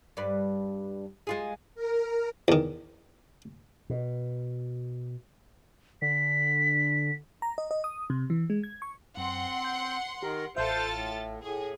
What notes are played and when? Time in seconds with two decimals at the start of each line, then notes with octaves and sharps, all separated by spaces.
0.17 G2 B4 D5
1.27 G#3 F4 G#4
1.75 A#4
2.48 E2 D#3
3.90 B2
6.02 D3 B6
7.42 A#5
7.58 D#5
7.71 D#5
7.84 D#6
8.10 C3
8.30 E3
8.50 G#3
8.64 G#6
8.82 C#6
9.17 F#2 C4 F#5 C6
9.64 G6
10.23 D#3 G4 A#4
10.57 A1 F4 A4 C5 E5 A6
10.93 A2
11.42 A2 G#4